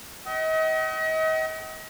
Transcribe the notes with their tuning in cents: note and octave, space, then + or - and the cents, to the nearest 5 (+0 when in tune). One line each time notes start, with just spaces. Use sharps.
D#5 +35 F#5 +45